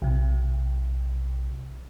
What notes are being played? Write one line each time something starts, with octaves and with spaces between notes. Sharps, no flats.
B1 C3